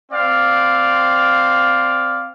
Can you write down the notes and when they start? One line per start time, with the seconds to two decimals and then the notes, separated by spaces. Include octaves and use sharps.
0.12 C4 D5 F5